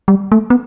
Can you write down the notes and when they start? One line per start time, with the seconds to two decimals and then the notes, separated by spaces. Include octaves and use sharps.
0.08 G3
0.32 A3
0.50 B3